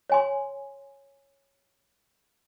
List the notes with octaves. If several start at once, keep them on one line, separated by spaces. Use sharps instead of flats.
C#5 G#5 C6